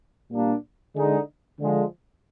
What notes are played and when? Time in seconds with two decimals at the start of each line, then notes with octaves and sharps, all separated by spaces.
0.31 A#2 G3 A#3 D4
0.96 D3 G#3 D#4
1.60 D3 F3 G#3